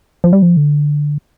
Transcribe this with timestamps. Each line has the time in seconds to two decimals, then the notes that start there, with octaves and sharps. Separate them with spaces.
0.24 F3
0.33 G3
0.42 F3
0.57 D3